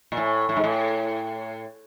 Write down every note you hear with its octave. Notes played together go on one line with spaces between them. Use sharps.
A#2
A2
A2
G#2
A2